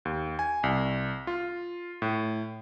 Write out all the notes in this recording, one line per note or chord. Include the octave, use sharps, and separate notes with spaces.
D#2
G#5
C2
F4
A2